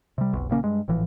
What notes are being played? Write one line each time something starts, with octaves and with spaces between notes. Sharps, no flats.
C3 G3
F1 B1
A#1 C#3 A#3 C#4
G2 G#3
G#1 A2 E3 F3